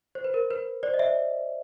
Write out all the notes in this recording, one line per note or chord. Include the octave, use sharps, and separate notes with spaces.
C5
B4
A#4
B4
C5 D5
D#5
D5 E5